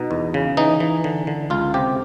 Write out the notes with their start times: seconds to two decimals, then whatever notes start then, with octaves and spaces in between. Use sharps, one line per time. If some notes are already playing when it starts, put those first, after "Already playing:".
Already playing: B2 D#4
0.11 E2
0.34 C#3
0.57 E3 D#4
0.80 E3
1.04 D3
1.27 D3
1.50 C#2 F4
1.74 C3 G4